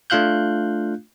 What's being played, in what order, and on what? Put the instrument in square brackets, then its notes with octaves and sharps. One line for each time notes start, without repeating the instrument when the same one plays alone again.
[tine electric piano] A3 D4 F4 F5 F#6 G6